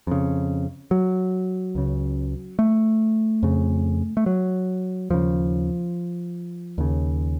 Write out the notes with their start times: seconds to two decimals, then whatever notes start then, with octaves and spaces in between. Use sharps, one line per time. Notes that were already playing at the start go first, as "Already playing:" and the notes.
0.07 F2 C#3
0.91 F#3
1.75 C#2 C#3
2.59 A3
3.43 F2 C#3
4.17 A3
4.26 F#3
5.10 D#2 C#3 F3
6.78 D#2 C#3